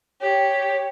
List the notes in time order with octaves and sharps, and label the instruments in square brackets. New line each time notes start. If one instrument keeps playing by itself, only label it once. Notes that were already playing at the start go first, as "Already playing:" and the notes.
[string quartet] G4 [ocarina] C#5